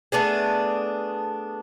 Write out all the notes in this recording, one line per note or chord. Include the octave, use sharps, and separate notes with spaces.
A3 B3 D4 G#4